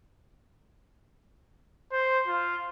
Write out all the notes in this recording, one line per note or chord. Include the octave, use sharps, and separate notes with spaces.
C5
F4